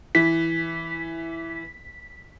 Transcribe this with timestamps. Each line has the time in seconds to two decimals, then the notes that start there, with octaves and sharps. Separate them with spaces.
0.15 E3 B6